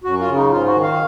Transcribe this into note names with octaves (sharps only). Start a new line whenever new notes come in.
F#2 F#4
F4
C#3
D#4
G#2 F4
F#4
D#3
F5